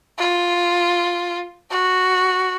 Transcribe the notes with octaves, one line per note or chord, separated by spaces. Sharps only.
F4
F#4